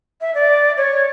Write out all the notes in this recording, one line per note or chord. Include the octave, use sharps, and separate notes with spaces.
E5
D5
C#5